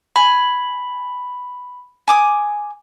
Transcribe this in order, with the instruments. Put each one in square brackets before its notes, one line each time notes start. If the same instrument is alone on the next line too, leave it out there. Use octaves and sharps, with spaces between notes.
[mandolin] G#5 [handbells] B5
[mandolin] G#5 D6 D#6